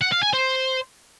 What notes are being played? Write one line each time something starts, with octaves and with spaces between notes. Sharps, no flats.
F#5
F5
G#5
C5